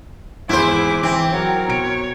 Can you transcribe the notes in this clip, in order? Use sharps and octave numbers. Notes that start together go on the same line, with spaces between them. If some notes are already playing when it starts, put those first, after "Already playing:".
G#1 E2 E4 G#4 C5 D6
E3 C4
F#3 A#4 C#5 F#5
B2 C#5 D7